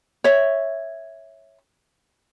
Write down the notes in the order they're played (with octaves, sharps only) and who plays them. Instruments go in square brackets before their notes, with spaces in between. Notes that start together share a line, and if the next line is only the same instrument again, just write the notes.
[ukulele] C#5 E5